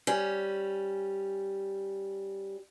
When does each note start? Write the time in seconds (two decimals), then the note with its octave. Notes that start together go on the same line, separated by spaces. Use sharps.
0.07 G3 C#4